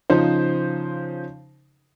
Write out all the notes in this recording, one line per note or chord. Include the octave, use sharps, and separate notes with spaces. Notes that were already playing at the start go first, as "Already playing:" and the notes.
C#3 F3 D#4 C5